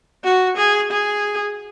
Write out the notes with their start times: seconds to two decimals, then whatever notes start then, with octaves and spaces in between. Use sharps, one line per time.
0.24 F#4
0.57 G#4
0.91 G#4